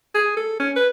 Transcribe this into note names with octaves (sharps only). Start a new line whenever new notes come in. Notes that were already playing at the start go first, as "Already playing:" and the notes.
G#4
A4
C#4
B4